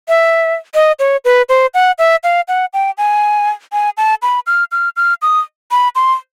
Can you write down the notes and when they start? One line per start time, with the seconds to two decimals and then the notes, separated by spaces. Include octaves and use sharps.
0.08 E5
0.75 D#5
0.99 C#5
1.25 B4
1.49 C5
1.74 F#5
1.98 E5
2.24 F5
2.48 F#5
2.73 G5
2.98 G#5
3.72 G#5
3.97 A5
4.22 B5
4.47 F6
4.72 F6
4.97 F6
5.22 D#6
5.71 B5
5.95 C6